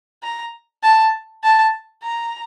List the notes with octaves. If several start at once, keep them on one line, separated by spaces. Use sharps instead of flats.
A#5
A5
A5
A#5